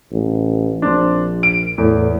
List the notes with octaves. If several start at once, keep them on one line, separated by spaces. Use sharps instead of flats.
A1
A#1 C4 D4
D7
E2 A2